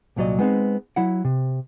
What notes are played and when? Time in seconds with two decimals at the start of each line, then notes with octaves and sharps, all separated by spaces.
0.16 C2 A#2 F#3 D5 D#5
0.38 G#3 B3 C4 D#4
0.96 F#3 E4 F#5
1.24 C3